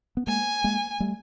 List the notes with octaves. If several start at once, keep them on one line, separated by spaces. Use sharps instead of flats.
B3
G#3 A#3 G#5
G#3 A#3
G3 A3